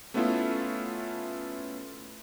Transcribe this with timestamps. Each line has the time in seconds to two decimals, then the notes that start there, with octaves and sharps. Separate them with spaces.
0.14 A3 B3 C#4 E4 F4 A4